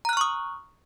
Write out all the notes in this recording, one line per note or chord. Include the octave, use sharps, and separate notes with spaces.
A#5 C#6 D#6 F6 F#6